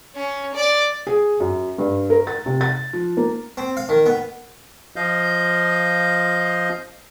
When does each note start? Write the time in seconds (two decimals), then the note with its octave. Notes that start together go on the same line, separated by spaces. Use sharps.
0.16 C#4
0.56 D5
1.07 G#4
1.40 F#2
1.78 G2
2.10 A#4
2.27 A6
2.46 C3
2.61 A6
2.93 F3
3.17 A#3
3.57 C4
3.77 F5
3.89 D#3
4.06 B3
4.96 F3 D#5 F5 G6